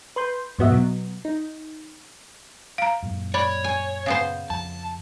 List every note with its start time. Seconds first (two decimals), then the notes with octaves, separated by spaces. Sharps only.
0.16 B4 C6 G6
0.58 F2 G#2 B3 F#4 D#5 E5
0.70 B2 F#3 B3
1.25 D#4
2.78 F5 A#5
3.03 F#2 A#2
3.34 C#5 D5 B5
3.64 G#5
4.06 C#3 B3 C5
4.50 F2 A5